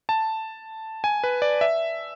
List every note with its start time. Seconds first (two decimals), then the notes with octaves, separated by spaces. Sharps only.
0.09 A5
1.04 G#5
1.24 B4
1.42 D5
1.61 E5